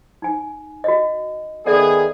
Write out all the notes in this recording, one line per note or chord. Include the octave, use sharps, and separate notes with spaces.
D#4 G#5
F#4 D#5
D#3 B3 G#4 A4 D5 E5